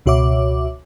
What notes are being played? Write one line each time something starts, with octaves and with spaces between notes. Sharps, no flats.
C#2 B2 F#4 C#5 E5 D6